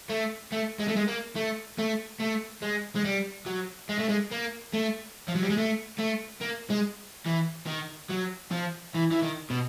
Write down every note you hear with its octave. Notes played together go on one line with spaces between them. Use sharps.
A3
A3
G#3
A3
G#3
A#3
A3
A3
A3
G#3
G#3
G3
F#3
G#3
A3
G#3
A#3
A3
F3
F#3
G3
G#3
A3
A3
A#3
G#3
E3
D#3
F#3
F3
E3
E3
D#3
B2